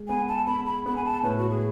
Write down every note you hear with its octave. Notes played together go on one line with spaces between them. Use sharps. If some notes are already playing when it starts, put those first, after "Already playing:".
Already playing: G#3
B3 G#5
A5
B3 B5
B5
B3 B5
G#5
A5
A2 B4
F#4
G#4